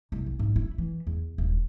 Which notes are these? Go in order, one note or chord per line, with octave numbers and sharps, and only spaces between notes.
C2
B1
G#2
E4
E3
E2
D#1